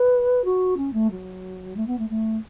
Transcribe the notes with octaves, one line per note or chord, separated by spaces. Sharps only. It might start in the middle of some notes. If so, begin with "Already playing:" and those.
Already playing: B4
F#4
C#4
A3
F#3
A3
B3
A3
A3